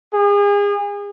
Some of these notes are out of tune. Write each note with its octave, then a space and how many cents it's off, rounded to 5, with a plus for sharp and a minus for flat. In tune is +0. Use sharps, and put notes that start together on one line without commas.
G#4 -35